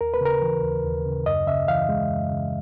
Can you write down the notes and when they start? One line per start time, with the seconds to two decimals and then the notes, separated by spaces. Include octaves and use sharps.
0.01 D#2 A#4
0.14 B4
0.21 C#3 A#4
0.42 E3
0.63 D#2
0.85 D#2
1.06 C#3
1.26 F#2 D#5
1.47 C#3 E5
1.68 E3 F5
1.89 G#3
2.11 F#2
2.31 C#3